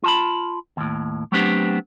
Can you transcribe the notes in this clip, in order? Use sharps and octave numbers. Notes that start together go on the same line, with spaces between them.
F4 A5 B5
D#2 A2
F#3 A3 B3 C4 D4 G4